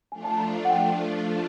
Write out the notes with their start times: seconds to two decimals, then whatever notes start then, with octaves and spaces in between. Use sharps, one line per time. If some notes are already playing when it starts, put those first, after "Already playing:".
0.12 F3 A3 D4 F4 G#5
0.24 A5
0.38 A#5
0.65 F#5
0.70 G5